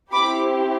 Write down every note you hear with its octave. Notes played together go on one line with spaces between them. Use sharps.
C4 E4 G4 B5 D6